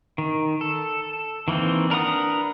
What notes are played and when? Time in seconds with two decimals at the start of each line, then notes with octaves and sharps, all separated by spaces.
0.18 D#3
0.61 A4
1.48 D#3 E3 A#3 C4
1.90 D4 A#4 B4 F#5 D#6